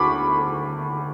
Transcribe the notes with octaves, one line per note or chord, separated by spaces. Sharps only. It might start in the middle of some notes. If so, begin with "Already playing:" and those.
Already playing: D2 B5 C#6 D6